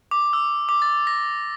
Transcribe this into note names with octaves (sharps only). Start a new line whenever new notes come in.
D6
E6
D6
A6
A#6